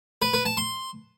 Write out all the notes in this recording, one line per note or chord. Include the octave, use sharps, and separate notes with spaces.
B4
B4
A5
C6